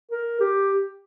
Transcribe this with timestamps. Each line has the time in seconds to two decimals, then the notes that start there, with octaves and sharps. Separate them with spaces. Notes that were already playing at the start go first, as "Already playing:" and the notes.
0.11 A#4
0.40 G4